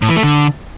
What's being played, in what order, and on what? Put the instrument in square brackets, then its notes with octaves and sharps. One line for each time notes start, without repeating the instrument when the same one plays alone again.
[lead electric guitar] A2
E3
A3
D3